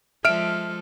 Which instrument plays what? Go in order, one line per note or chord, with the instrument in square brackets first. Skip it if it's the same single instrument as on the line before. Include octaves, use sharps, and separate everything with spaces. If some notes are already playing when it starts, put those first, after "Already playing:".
[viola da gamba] F3 G#3 A4 [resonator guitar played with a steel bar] E5 [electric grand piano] F6 D7